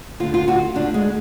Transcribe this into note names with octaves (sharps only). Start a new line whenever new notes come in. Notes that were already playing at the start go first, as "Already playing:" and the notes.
D2 D3 F4
F4
F#4
D2 D3 D4
G#3